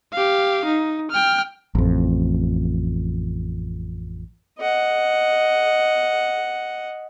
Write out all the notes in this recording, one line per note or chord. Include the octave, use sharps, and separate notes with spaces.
G4 F5
D#4
G5 F6
A1 F2
D#5 F#5